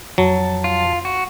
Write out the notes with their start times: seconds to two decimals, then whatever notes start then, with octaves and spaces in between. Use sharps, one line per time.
0.18 F2 F#3 A5
0.64 F4
1.05 F#4